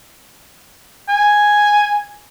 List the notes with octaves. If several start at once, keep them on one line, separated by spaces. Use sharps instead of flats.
G#5